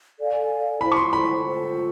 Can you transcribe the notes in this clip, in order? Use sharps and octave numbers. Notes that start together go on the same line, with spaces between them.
A4 D5 F5 G#5
E4 A4 C5 B5
C#6
C6
B5
F4 A4 C5